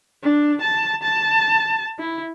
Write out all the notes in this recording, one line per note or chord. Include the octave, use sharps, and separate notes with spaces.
D4
A5
A5
E4